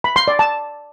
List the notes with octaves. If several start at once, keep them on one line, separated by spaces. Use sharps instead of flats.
B5
C6
D5
A5